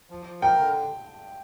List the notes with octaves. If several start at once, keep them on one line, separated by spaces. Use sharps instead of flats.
F3
F3
A#4 G5
D3